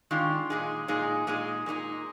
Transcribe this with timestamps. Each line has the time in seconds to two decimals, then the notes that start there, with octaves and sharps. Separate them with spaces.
0.11 D#3 G#3 D4 F4
0.50 A#2 G#3 D#4 G#4
0.88 A#2 G#3 D#4 G#4
1.27 A#2 G#3 D#4 G#4
1.66 A#2 G#3 D#4 G#4